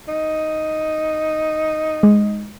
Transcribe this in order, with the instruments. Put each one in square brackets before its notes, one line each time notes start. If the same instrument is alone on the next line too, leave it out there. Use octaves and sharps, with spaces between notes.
[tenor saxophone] D#4
[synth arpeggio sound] G#3